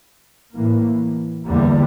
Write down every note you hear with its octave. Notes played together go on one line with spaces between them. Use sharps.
A2 E3 A#3
E2 D3 G3 A#3